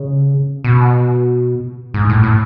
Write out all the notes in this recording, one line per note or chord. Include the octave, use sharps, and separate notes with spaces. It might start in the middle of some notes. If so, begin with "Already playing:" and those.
Already playing: C#3
B2
G#2
A2
A2